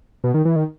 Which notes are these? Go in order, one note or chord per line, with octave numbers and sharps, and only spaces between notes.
B2
D#3
E3
D#3